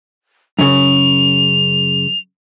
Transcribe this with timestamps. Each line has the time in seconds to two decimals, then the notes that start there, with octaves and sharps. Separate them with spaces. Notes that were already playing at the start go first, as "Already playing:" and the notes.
0.59 F#2 C#3 F7